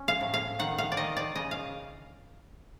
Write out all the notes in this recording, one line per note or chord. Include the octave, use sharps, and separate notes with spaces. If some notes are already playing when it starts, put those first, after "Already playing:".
Already playing: C#4
F5
A2
F5
D#3 F#5
F5
D5
D#3 D#5
D5
C#3 D#5
F5